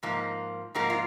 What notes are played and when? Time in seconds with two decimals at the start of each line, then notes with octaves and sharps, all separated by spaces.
0.03 G#2 F3 A#3
0.75 G#2 F3 A#3 F#4 A#4
0.90 F4